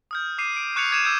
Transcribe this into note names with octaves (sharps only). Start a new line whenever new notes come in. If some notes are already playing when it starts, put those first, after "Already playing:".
D#6 F6 G6
D6 C7 D#7
D7
C#6 F#6 G#6 C#7 F7
D6 G#6 C7 D#7 E7
D6 E6 F#6 G6 D7